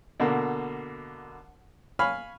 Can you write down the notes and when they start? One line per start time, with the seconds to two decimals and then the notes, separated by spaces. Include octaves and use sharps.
0.20 B2 D3 A#3
1.99 F5 G#5 B5 C#6 F6